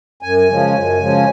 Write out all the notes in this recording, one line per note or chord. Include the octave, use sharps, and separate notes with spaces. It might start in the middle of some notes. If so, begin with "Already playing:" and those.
F#2 G#5
C#3 F3 G#3 C#4
F#2
C#3 F3 G#3 C#4